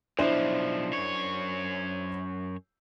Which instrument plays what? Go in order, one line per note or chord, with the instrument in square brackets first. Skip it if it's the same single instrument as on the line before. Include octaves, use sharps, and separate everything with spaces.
[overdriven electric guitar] B1 F3 [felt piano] D4 E4 C5
[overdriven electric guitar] F#2 C#5